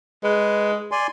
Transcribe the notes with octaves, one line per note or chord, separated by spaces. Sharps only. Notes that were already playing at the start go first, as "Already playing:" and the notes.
G#3 B4
D5 G#5 C6